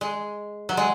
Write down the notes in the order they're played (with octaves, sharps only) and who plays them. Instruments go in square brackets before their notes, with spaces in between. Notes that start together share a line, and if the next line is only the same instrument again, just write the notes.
[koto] G#3
F#3
G#3